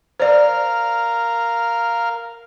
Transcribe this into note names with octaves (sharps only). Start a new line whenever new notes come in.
A#4 C5 D5 F5